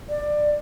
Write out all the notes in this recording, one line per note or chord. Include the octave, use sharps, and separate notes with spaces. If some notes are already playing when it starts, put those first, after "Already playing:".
D5